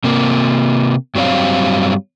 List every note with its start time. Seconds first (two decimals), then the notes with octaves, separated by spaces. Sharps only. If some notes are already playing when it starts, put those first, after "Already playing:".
0.04 C3 A#3
1.15 G2 F#3 G3 C4 C#5 F5